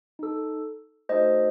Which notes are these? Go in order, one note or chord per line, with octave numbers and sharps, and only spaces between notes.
D#4 A4
A3 D#4 F#4 A4 C5 D#5